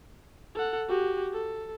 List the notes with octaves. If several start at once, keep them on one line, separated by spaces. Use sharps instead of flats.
A4 F#5
F#4 G4
A4